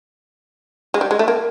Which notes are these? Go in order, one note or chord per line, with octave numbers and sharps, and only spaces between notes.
G#3
G3
G#3
A3
A#3